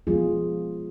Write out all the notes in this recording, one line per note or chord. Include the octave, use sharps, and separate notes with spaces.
F3 G#3 B3 F4 G#4